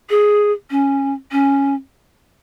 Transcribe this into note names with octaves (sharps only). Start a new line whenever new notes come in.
G#4
C#4
C#4